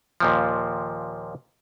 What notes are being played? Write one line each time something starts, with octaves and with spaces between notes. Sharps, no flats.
D#2 A#2 F3